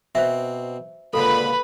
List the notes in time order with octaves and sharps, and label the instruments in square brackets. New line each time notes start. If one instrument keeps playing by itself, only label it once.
[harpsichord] B2 C4 [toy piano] C5 E5
[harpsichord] C#2 A#2 D3 [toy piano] A4 [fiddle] B4 B5